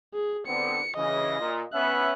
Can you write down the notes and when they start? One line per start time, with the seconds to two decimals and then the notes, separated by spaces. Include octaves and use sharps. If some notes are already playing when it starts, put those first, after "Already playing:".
0.14 G#4
0.47 D3 B3 C4 C#7
0.96 C#3 E3 D#5 A#6
1.40 A#2
1.73 B3 C#4 E5 F#6